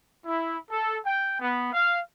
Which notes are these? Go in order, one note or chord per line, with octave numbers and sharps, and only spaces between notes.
E4
A4
G5
B3
F5